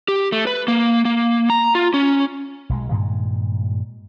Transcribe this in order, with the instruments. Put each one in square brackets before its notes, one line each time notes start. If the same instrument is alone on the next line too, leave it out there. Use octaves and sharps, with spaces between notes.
[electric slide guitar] G4
A3
B4
A#3
A#3
A#5
F4
C#4
[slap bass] B1 G#3
G2 A#2 D#3 G#3